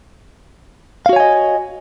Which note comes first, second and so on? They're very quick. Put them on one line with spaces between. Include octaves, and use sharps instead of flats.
F5 F#4 C#5 G#5 D#5